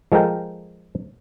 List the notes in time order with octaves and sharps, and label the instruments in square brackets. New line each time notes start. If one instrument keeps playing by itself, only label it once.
[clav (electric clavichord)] F3 G#3 A4 A#4 G5